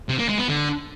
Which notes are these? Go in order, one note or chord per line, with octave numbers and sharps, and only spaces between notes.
C3
A#3
G#3
B3
D3